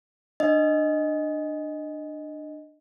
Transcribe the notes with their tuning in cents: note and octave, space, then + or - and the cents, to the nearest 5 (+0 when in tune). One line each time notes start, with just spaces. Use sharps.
D4 +25 D#5 +0